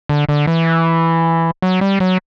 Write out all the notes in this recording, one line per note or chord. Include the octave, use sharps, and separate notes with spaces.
D3
D3
E3
F#3
G3
F#3